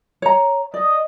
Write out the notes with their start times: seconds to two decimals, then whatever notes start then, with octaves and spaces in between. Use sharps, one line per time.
0.22 C#5 A#5
0.74 D5 D#5